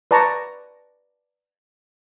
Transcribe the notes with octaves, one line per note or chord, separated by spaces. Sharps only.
B4 D5 A5 A#5 C#6